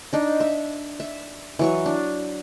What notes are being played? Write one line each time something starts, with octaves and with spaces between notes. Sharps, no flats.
D4 D#4
E5
E5
E3 F#3 C#6
D4